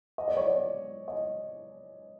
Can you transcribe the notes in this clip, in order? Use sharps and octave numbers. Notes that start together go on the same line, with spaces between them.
D#5
D5
C#5
D5
D#5